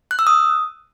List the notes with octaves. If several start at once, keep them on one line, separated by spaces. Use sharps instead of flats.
F#6
E6
D#6